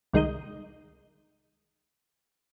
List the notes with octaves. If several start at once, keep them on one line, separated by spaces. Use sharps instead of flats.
C2 D#3 G#3 D#4 D#6 G6